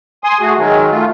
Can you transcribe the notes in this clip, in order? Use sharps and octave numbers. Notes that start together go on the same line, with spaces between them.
G#5 C6 D#6
A3 F#4 G#4
D#3 F#3 G#3
A3 F4